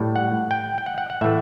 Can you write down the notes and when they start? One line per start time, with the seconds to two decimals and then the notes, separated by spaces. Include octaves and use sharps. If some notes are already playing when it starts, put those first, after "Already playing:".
Already playing: A2 G3
0.16 F#5
0.51 G5
0.78 G5
0.86 F#5
0.98 F#5
1.10 F#5
1.21 A2 E3 A3 E5